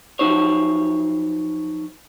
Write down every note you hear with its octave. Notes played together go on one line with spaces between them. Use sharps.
F3 F#3 D#4 C5 C#5